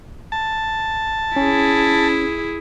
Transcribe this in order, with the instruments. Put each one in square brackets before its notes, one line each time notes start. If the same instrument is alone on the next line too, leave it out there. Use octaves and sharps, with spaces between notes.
[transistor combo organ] A5
[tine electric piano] C#4 [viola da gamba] E4 G#4